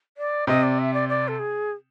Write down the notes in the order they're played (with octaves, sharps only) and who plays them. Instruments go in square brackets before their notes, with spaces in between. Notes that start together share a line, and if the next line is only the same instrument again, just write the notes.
[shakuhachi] D5
[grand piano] C3 C4 [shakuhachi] D#5
[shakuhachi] D5
E5
D5
D5
A4
G#4